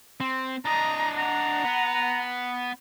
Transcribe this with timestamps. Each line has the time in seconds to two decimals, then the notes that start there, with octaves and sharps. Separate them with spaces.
0.20 C4
0.65 D4 D#5 A#5
1.18 F#5 A#5
1.65 B3